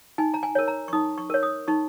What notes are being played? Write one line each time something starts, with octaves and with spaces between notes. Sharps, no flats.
D#4 G#5
A#5
G#5
A#4 C#5
A#5
C#6
D#4 D#6
C#6
A#4 C#5
D#6
D#4 C#6